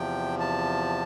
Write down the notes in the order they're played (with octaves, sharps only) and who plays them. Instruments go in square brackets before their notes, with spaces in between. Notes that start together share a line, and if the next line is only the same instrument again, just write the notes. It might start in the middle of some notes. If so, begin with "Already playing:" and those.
Already playing: [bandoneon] E2 C3 F3 G5
A5